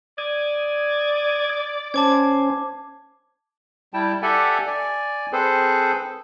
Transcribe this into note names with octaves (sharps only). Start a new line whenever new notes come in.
D5 D#6 G#6
C#4 C5 G#5 A5 D6 G#6
G3 E4 G5 A5
G4 A4 D5 E5 F#5 G#5
D5 G#5
C4 G#4 A4 B4 C5